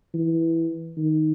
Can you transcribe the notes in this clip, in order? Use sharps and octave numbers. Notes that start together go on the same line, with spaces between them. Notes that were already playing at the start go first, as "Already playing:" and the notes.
E3
D#3